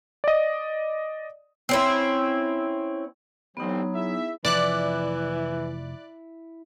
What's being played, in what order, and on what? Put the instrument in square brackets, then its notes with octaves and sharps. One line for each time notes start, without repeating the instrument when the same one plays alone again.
[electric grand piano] D5 D#5
[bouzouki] C4 C#4 E4
[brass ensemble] A1 C4 [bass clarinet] F#3 [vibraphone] B3 D#4
[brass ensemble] E4 G#4 E5
[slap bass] F1 F3 [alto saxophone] E3 [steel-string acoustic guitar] E4 [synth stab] D5 F#6